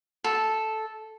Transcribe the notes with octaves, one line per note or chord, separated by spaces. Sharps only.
A4